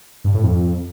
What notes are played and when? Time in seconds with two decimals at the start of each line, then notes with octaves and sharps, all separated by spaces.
0.24 G2
0.34 A2
0.44 F2